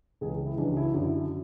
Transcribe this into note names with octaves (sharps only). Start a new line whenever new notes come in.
C#2 C#3 E3 G#4
E4
C#2 C#3 E3 D4
F#4
E4
F#2 D3 F#3 E4